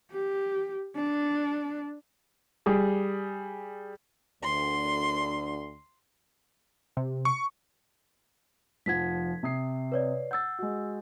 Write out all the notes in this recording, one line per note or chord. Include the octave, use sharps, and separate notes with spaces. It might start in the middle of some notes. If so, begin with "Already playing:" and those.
G4
D4
G3 G#4
D2 C6
C3
C#6
F1 F3 F#5 G#6 B6
C3 D#6 C7
B4 C#5 D5
F#5 E6 G6 A6
G#3 F#4